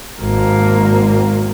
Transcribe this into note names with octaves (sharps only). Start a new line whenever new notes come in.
G#1 A#3